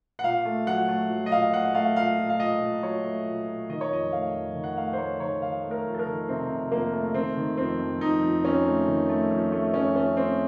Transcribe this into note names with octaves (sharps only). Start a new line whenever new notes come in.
F#5
A#2 F5
A3
F#3 F#5
A3
F#3
D#5
A#2 F5
A3 F#5
A3 F5
A#2 F5
A#2
F5
A#2 D#5
A#2
F#3 C#5
A3
A#2
A#2
D#3 D#5
C#5
F2 D#5
A3 F5
F2
D#3
F#5
A3 F5
C5
A3 C#5
D#3 C#5
D#3 F5
A3
A#4
F2
A4
A#4
D#3
C3 C4
C3
F2 A#3
A3
D#3 C4
D#3
F2 C4
F2
F2 D#4
F2
F2 C#4
A3
D#3
A3
F2
A3
F2 C#4
A3 C#4
A3 C4